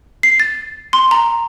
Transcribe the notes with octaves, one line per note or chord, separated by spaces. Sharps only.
C7
A6
C6
A#5